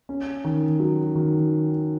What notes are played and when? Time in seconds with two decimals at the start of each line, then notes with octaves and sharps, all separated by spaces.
0.09 C#4
0.44 D#3
0.80 F#3
1.15 D#3